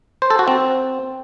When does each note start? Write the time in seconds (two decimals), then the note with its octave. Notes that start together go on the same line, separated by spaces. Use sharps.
0.22 C5
0.30 A4
0.39 F#4
0.48 C4